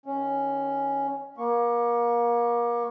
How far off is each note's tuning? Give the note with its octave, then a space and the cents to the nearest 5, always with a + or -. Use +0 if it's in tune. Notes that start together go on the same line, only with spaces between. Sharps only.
D#3 -10 C#4 +0
A#3 +30 C#6 +0